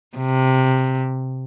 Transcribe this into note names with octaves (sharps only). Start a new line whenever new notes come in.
C3